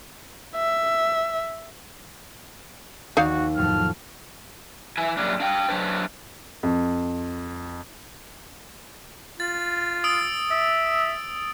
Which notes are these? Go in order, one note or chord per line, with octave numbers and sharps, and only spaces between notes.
E5
D#2 D#4 F#4 D5 F5
F2 A2 F#3 F6
E3 E4 G#5
F#2 A#2 G3 D4
D4 F5 G5
F#3 D4 B4 C5
F2
F4 A6
D#6 E6 D7
E5